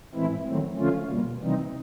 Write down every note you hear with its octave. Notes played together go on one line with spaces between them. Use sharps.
A2 E3 G#3 C4 E4
D#3 F#3 A3 C4
D3 F3 A3 C#4 F4
B2 G3 A#3
C3 E3 G3 C4 D#4